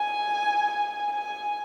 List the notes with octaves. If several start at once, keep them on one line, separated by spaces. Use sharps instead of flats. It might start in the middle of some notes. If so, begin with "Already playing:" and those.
Already playing: G#5
G#5
G#5